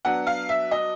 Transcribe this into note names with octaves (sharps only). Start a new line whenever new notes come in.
F#3 B3 D4 F#5
F5
E5
D#5